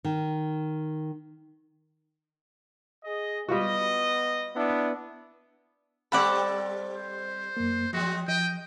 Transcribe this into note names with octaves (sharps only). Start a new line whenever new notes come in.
D#3
G#4 D#5
G3 B3 F4 F#4 D#5
B3 D4 E4
G3 C4 A4 D5 F#5 B5
C5
F#2 A#3
F3 F#3 G#3 F#4
F3 D#5 G5